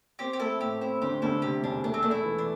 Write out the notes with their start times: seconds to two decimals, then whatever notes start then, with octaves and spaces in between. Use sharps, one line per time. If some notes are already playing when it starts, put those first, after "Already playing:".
0.19 C4 G4 C5
0.33 G4
0.39 A3 E4 A4
0.60 A2 G4
0.81 C4 E4
1.02 D2 G4 C5
1.22 D2 E4 A4
1.42 C3 G4
1.63 E1 D4
1.84 A3 D4
1.94 C4
2.03 A3 D4
2.11 E4
2.24 E3
2.38 D4